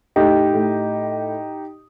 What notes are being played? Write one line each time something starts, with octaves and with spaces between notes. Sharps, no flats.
A2 D#4 G4
A2